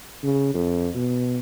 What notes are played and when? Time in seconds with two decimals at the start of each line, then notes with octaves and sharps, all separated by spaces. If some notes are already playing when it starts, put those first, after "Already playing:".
0.23 C#3
0.54 F2
0.95 B2